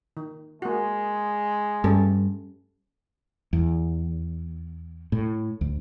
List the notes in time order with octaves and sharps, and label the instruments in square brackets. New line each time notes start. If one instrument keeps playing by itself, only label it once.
[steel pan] D#3
[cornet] G#3 [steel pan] A#3 F#4
[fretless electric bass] G2 [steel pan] A3 C#4 A4
[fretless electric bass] E2
A2
D2